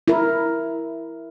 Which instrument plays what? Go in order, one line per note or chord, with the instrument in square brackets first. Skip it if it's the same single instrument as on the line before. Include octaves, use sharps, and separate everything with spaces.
[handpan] E4 A#4